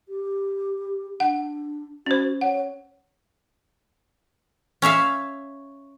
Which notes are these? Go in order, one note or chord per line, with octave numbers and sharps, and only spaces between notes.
G4
D4 F#5
C#4 F#4 C5
C#5 F#5
C#4 C#5 E5 F5